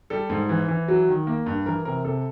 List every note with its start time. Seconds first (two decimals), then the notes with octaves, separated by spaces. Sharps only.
0.10 G3 A4
0.30 G#2
0.49 E3
0.68 E3
0.88 F#3
1.08 D#3
1.27 A#3
1.46 G2
1.66 E3 A#4
1.85 C3 A#4
2.04 C3 A4